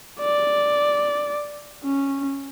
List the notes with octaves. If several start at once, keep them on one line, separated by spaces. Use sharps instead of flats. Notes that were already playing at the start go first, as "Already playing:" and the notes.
D5
C#4